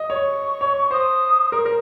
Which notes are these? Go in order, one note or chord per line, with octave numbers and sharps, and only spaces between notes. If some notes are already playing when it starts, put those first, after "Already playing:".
Already playing: D#5
C#5 C#6
C#5
C5 D#6
A#4
A#4